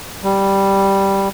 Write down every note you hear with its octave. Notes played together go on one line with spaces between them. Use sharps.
G3